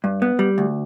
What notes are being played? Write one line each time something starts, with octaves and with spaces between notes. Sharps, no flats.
G2
B3
G3
D2